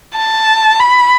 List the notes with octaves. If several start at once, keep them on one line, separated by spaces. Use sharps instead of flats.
A5
B5